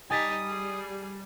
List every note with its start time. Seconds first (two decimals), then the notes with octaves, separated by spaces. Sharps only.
0.10 G3 D#4 G4 G#5 D#6 A6 B6
0.47 G#4